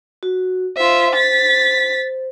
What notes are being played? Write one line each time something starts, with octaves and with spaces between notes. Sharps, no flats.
F#4
F4 C5 E5
A6 B6